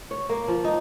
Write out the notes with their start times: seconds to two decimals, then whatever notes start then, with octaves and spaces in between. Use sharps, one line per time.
0.11 C#5
0.29 A#3
0.48 F3
0.64 D#4